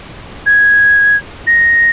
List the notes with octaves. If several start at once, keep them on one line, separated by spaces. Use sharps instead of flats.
G#6
A#6